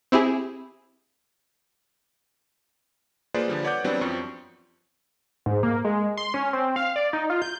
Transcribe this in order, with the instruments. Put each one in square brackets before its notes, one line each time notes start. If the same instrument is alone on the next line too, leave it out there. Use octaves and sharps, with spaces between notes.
[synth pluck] C4 E4 G4 G#4
[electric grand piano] A#3 F4 G#4 B4 C5 D5
D3 F3 G3
B4 C#5 D5 F#5 D6 G6
E3 F#3 G3 B3 C4 D4
F#2 F3 C4 C#6
[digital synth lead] G#2
A#3
G#3
C6
C#4
C4
F5
D5
D#4
F4
G6